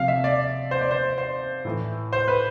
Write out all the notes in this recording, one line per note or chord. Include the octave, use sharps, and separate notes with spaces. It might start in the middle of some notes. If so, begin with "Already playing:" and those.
Already playing: C3 F3 F5
E5
D5
C5
D5
C5
C5
A2 E3
C5
B4